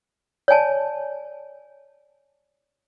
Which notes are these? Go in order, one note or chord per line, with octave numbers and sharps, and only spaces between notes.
C#5 D5 G#5 A5